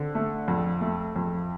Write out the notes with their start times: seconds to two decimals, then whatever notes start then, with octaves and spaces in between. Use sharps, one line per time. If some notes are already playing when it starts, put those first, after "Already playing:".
Already playing: D3 C4
0.15 A3
0.48 F2
0.81 A3
1.16 F2